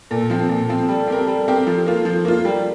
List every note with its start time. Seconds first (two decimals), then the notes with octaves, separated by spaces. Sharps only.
0.10 A#2 A4
0.30 F3 C4
0.49 A#2
0.69 F3 C4
0.89 G3 A4
1.08 C4 G4 A#4
1.27 G3
1.48 C4 G4 A#4
1.67 F3 A4
1.86 A#3 F4
2.05 F3
2.25 A#3 F4
2.45 G3 A#4